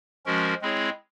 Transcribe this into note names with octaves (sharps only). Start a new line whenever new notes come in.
F3 G#3 C#4 F#4 A#4
G#3 C4 E4 G#4 C#5